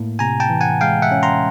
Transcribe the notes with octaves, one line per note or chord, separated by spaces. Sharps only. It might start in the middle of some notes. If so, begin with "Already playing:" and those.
Already playing: A2 A#3
C3 G#5 A#5
G5 A5
E3
F#5 G#5
G#3 F5 G5
E5 F#5
C#4
A#5 C6